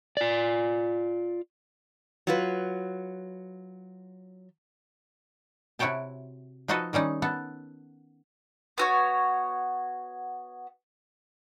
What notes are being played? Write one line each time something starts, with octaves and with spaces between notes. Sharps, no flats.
F4 D5
F#3 F4 B4
C3 E4 F#4 C#5 G5 A5
F3 D#4 F#4 A4 B4 D#5
D#3 G3 C#4 D#4
B3 A4
B3 F#4 C#5